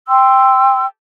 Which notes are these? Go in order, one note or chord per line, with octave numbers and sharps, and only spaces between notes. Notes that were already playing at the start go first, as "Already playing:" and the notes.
G5 C6 E6